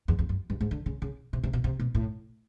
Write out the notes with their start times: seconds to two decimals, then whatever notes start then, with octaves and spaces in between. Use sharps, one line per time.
0.08 E2
0.19 E2
0.29 F#2
0.50 G2
0.61 G#2
0.71 D3
0.86 C#3
1.02 C#3
1.33 C3
1.43 C3
1.53 B2
1.64 C3
1.79 B2
1.95 A2